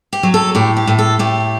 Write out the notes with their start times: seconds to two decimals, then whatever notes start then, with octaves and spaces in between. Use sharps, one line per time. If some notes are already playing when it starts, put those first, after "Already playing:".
0.13 G4
0.23 F#3
0.34 A4
0.55 A2 G4
0.77 G4
0.87 A2
0.99 A4
1.19 A2 G4